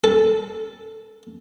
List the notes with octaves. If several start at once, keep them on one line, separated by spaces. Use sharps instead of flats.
A4